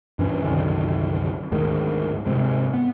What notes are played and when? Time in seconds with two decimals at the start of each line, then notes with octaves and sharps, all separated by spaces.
0.19 G2 E3 C#4
0.43 C2 F#2 D3 D#3
1.52 D2 G#2 D#3
2.26 G#2 C3 G#3
2.74 B3